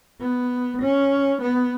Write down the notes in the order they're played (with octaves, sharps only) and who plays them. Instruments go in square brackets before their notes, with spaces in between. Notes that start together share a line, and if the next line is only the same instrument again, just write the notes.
[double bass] B3
C#4
B3